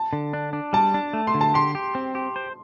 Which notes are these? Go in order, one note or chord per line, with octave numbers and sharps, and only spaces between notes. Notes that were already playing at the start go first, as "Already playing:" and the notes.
Already playing: A5
D3
D4
D4
G3 A5
D4
A3
C6
D3
A5
G4 C6
G4
C4
G4
C5